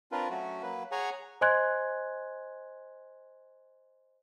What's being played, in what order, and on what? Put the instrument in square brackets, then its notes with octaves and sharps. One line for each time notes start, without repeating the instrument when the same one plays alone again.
[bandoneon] C4 D4 F4 A#4 B4
F#3 A3 C#4 F#4
F#3 A#3 B4
G#4 C#5 F#5 G#5 A#5
[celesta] C5 D#5 G#5 C6 F#6 G#6